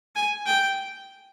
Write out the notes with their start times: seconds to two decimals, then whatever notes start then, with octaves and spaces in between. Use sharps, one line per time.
0.15 G#5
0.46 G5